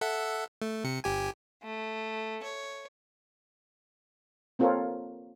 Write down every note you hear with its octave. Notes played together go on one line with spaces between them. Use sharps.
A4 E5 F#5
A3
C3 C#7
G1 G4 G#5
A3
C#5
A#3 C4 F4 A4 A#4 C#5